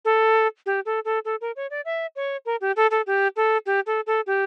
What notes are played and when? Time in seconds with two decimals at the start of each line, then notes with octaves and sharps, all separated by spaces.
0.05 A4
0.66 G4
0.86 A4
1.05 A4
1.25 A4
1.41 A#4
1.56 C#5
1.70 D5
1.85 E5
2.16 C#5
2.45 A#4
2.61 G4
2.76 A4
2.91 A4
3.07 G4
3.36 A4
3.66 G4
3.86 A4
4.07 A4
4.27 G4